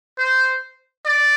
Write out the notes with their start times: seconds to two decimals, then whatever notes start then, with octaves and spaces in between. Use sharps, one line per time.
0.18 C5
1.06 D5